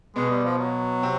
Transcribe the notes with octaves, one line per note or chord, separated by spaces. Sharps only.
B2 G#3 B3
G3
F3
F#3
C3 C4